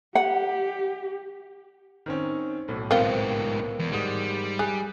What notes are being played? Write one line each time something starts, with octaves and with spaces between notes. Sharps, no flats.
G4 F#5
D#3 C4 C#4
B1 A2
G#2 B3 C4 F4 A#4
E2
G#2 G3 G#3 D#6
G#4 F#6